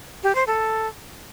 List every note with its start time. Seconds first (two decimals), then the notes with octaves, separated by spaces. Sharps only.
0.23 G4
0.35 C5
0.47 A4